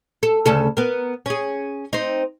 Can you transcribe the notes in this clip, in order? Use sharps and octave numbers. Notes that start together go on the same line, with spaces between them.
A4
D2 C#3 A4
B3 A#4
C#4 G#4
C4 D#4